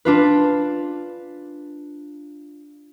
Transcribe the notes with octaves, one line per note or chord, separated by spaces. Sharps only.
D4 F4 B4